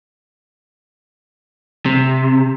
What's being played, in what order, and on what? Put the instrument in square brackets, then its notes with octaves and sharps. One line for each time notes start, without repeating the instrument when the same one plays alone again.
[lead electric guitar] C3